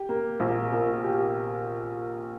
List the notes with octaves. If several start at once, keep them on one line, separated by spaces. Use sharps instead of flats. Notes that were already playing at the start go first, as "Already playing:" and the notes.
Already playing: G4
A#3
A#1
A#2
G4